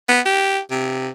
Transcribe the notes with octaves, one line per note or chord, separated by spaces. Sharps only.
B3
G4
C3